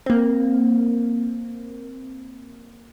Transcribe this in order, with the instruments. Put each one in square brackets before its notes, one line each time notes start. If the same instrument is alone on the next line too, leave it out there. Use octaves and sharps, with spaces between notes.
[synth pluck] A#3 C4